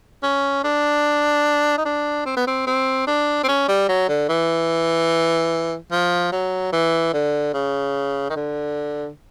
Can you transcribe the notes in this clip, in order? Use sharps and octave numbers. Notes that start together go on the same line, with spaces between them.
C#4
D4
D#4
D4
C4
B3
C4
C4
D4
C4
C#4
G3
F#3
D3
E3
F3
F#3
E3
D3
C#3
D#3
D3